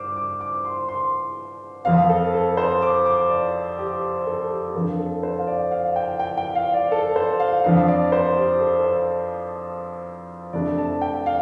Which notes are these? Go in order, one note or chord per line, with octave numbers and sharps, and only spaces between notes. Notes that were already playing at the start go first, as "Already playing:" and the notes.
Already playing: G2 C5 D5 D6 F6
D6
D6
C6
C6
F2 F3 C4 F5
A4
A4
C5
D6
D6
D5
G4
A4
G4
F2 F3 D4 A4
A4
C5
F5
D5
F5
G5
G5
G5
F5
D5
A4
C5
F5
F2 F3 D4 F5
D5
C5
G4
A4
C5
F2 C3 A3 D4 D5
A5
G5
F5